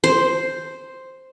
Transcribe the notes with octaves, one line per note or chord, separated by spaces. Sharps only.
C5